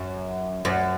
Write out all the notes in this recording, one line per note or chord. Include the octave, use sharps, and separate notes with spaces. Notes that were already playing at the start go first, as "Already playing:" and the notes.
Already playing: F#2
F#2